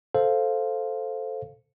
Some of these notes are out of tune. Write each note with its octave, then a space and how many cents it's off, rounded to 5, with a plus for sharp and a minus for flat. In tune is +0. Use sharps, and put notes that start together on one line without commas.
A4 +0 C5 +0 F5 +0